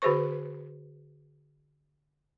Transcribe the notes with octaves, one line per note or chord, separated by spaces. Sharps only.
D3 F#4 G#4 B4 C5 C#6